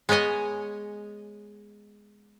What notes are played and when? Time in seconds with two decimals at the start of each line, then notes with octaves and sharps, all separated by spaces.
0.09 G#3 B3 C#5 D#5 G#5